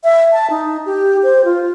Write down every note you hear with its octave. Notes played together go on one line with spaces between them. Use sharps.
E5
A5
D#4
G4
C5
F4